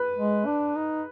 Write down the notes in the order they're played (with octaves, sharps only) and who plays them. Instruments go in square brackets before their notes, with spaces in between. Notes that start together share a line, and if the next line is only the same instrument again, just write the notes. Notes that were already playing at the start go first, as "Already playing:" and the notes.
Already playing: [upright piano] B4
[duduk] G#3
D4
D#4